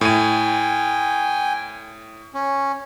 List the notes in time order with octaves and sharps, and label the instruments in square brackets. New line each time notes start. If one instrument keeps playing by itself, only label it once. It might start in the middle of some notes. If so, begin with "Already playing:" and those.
[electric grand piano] A2 D#7 [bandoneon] G5 G#5
[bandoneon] C#4